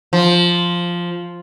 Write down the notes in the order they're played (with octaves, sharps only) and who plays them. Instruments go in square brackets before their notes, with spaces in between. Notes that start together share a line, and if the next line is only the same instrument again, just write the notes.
[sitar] F3